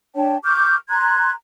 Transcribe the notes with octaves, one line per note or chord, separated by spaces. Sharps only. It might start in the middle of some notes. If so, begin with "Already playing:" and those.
D4 C#5 G5 A5
C#6 D6 F6 G6
A#5 C6 F#6 G#6